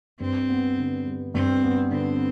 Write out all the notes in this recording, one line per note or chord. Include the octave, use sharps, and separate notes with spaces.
G2 C4
B3
D3
G3
G2 C4
B3
D3 C4